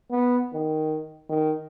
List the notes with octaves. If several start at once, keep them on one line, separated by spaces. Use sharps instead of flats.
B3
D#3
D#3